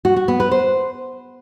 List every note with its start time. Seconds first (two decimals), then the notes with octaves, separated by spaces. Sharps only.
0.05 F#4
0.16 F#4
0.28 B3
0.40 B4
0.51 C5